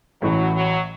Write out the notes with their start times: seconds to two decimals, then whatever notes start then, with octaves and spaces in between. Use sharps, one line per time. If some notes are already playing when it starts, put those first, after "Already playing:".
0.21 A1 A2 E3 F#3
0.54 F#3